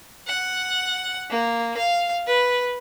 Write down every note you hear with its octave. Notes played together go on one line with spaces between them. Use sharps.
F#5
A#3
F5
B4